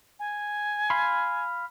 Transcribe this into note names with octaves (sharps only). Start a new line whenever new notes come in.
G#5
F5 B5 C6